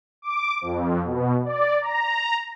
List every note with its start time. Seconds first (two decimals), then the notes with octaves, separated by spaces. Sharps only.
0.22 D6
0.61 F2
1.04 B2
1.45 D5
1.81 A#5